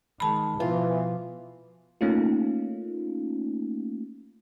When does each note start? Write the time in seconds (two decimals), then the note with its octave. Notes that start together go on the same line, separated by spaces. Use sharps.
0.20 D#3 G#3 A5 B5
0.60 B2 E3 F3 F4
2.01 A3 A#3 C#4 D#4 F4